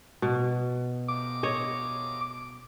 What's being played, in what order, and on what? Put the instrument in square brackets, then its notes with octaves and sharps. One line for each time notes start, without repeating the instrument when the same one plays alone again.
[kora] B2
[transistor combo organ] D6
[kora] C#5 D#5